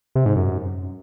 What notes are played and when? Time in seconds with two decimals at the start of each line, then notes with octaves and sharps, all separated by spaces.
0.15 C3
0.26 G#2
0.36 F#2